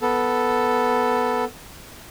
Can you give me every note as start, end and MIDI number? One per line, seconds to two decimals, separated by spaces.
0.02 1.44 59
0.02 1.44 69